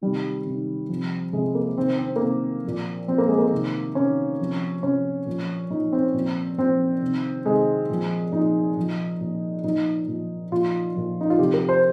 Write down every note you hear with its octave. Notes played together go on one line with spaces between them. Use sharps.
C3 D#3 G3
C3 D#3
C3 F3
C3 F3 G#3
A#3
C3 D#3 C4
C4
A#3
C3 D#3 C4
A#2 F3
A#2 F3 C4
A#3
G#3
A#3
C3 D#3
C3 D#3 C#4
C3 F3
C3 F3 C#4
A#2 F3
A#2 F3 D#4
C4
A#2 F3
A#2 F3 C4
C3 D#3
C3 D#3 G#3
A#2 F3
A#2 F3 D#4
A#2 F3
A#2 F3
A#2 F3 D#4
A#2 F3
A#2 F3 F4
A#2 F3
D#4
F4
C3 F3 G4
A#4
C5